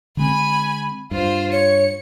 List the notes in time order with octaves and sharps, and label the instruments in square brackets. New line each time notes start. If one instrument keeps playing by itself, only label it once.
[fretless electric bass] D3 G#3 C4 [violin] G#5 B5
[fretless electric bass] G2 [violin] F4 C5
[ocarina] C#5 [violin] C#7